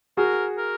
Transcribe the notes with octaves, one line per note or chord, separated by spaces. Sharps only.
F#4 G#4 A#4
A#4